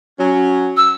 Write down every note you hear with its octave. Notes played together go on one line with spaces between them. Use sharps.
F#3 C#4
E6